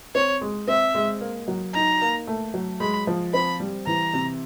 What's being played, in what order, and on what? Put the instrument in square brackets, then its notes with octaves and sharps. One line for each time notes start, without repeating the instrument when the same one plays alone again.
[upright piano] C4 [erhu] C#5
[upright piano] G#3
[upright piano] C4 [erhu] E5
[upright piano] G#3
A#3
F#3
[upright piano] D#4 [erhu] A#5
[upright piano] A#3
A3
F#3
[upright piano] G#3 [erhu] B5
[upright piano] F3
[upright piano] C4 [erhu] B5
[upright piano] G3
[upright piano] E3 [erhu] A#5
[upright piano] C3